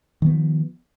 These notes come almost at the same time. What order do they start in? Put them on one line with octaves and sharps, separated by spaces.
D#3 B3 F3